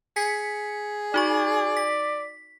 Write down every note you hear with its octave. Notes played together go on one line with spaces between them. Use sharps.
G#4 B6 C#7
D#4 F#4 D5 C#6
B6